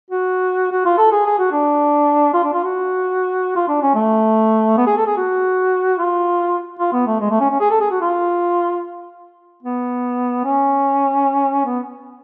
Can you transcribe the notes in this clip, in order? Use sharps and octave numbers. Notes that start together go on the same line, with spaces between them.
F#4
F#4
F4
A4
G#4
G#4
F#4
D4
F4
D4
F4
F#4
F4
D4
C#4
A3
B3
G#4
A4
G#4
F#4
F4
F4
B3
A3
G#3
A3
C#4
C#4
G#4
A4
G#4
F#4
F4
B3
C#4
B3